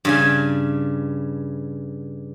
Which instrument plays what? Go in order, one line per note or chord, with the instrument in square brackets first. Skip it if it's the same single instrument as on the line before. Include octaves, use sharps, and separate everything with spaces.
[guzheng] G2 C#3 G#5